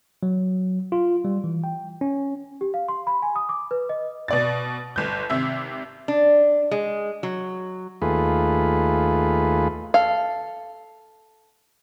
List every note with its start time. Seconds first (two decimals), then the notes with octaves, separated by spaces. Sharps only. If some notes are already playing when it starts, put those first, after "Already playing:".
0.23 F#3
0.92 F4
1.25 G3
1.44 E3
1.64 G5
2.01 C#4
2.61 G4
2.74 F5
2.88 C6
3.07 B5
3.22 G#5
3.36 D#6
3.49 D6
3.71 B4
3.89 D#5
4.28 B2 D5 A6
4.96 G1 G6
5.30 G#1 C3 E5
6.08 D4
6.71 G#3
7.23 F#3
8.02 D#2 A3 F4 G#4 B4
9.94 A4 F5